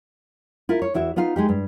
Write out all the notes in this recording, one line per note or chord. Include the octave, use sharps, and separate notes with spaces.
E4 F4 A#4
C#5
E2 E4 F#4 E5
B3 D#4 F4 F5
G#3 D#4 G4
G2